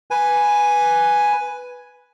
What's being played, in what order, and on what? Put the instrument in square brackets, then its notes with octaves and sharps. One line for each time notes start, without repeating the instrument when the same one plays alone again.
[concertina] B4 G#5